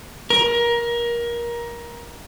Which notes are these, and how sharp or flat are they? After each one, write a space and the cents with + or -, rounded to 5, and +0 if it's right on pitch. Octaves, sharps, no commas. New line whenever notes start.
A#4 +20